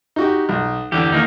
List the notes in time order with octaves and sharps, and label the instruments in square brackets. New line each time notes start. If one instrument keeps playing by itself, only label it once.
[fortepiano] D#4 F#4 G4
B1
[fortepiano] E2 [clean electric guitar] D3 G4
[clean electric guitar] D#3 A#3 D#4